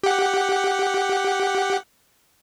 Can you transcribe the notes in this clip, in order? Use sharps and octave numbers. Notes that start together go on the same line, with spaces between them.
G4 F#5